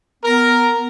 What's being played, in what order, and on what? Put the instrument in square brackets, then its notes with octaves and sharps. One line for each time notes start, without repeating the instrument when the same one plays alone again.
[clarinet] B3 [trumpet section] A#4